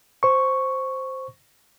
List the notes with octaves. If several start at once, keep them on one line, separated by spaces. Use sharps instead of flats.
C5 C#6